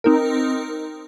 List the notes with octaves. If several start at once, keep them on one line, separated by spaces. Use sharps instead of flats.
C4 D#4 A#4